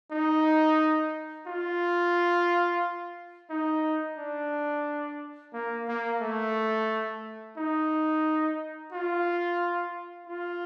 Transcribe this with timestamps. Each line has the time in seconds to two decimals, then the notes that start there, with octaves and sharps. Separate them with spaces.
0.11 D#4
1.47 F4
3.50 D#4
4.18 D4
5.54 A#3
5.88 A#3
6.21 A3
7.57 D#4
8.92 F4
10.27 F4